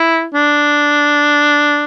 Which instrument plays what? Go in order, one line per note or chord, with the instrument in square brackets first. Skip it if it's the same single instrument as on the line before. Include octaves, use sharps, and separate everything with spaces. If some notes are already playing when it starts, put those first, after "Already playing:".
Already playing: [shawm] E4
D4